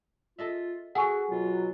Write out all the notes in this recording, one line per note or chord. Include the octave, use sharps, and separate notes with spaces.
F4 A4 D#5 E5
F#4 G#4 A4 F#5 G#5 C#6
B2 F#3 F4